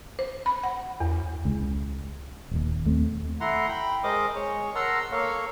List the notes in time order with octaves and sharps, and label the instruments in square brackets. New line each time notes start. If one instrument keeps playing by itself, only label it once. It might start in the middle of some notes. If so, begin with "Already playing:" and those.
[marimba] C5
B5
F#5
E2
[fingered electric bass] C#2 C#3
D#1 D#2
D#2 A3 C4
[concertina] A3 E4 F#5 A#5 C6
G5 B5
G#3 A#4 C5 D#5 D6 D#6
G#3 C#5
A#4 F#5 A5 A#5 C6 E6
A#3 A4 C#5 F5